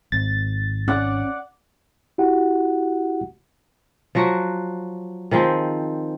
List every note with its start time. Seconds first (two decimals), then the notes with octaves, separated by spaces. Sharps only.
0.12 G#1 A6
0.88 C#4 D5 F#5
2.18 E4 F#4 G4 F#5
4.15 F3 F#3 F#4
5.31 D#3 F3 C4 G#4